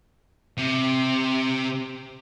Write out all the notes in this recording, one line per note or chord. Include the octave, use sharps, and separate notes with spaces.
C3